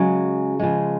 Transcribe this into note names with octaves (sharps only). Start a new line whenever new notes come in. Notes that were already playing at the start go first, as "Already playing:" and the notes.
Already playing: C#3 F#3 G#3
C#3 F3 G#3